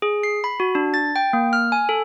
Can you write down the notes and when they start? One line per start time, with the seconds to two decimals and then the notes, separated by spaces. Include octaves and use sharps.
0.02 G#4
0.23 C7
0.44 B5
0.60 F#4
0.75 D4
0.94 A6
1.16 G5
1.33 A#3
1.53 F6
1.72 G#5
1.89 A4